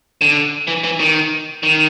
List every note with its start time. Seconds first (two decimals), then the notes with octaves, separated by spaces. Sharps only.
0.21 D3
0.68 E3
0.84 E3
1.00 D#3
1.63 D#3